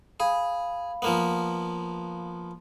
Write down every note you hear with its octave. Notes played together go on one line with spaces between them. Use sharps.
G#4 F5 B5
F3 A#3 B3